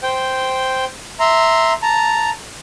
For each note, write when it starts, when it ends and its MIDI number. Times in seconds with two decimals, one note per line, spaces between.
0.03 0.85 72
0.03 0.85 79
1.20 1.73 76
1.20 1.73 82
1.20 1.73 84
1.82 2.30 81
1.82 2.30 82